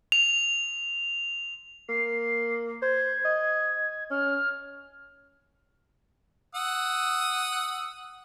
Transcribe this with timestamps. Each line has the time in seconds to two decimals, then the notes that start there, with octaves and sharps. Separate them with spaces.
0.12 F7
1.89 A#3 C7
2.82 C5 G#6
3.25 D#5
4.11 C#4 F6
6.55 F#5 D#6 E6